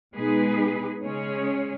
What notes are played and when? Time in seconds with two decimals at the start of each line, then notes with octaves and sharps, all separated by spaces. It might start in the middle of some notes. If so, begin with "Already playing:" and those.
0.14 B2 G#3 D#4 G#4 B4
1.03 C#3 G#3 C#4 G#4 C#5